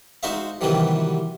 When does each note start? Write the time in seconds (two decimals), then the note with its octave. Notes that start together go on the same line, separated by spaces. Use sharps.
0.23 G#3 D#4 F#4 C5 E5 F5
0.61 C3 D#3 E3 F#3 G3 B3